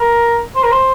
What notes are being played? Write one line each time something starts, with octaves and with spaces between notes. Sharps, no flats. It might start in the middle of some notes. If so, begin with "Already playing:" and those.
Already playing: A#4
C5
A#4
C5